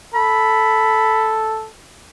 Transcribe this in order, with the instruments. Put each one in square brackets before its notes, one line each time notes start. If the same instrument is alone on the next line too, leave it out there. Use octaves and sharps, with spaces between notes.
[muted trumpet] A4 [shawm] B5